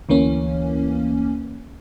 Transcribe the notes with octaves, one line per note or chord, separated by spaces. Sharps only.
D2 E3 A#3 C#4